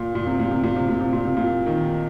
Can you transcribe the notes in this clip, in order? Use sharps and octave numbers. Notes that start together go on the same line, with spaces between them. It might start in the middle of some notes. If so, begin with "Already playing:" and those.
Already playing: A#2
A#2
C3
A#2
C3
A#2
C3
A#2
C3
A#2
C3
A#2
D#3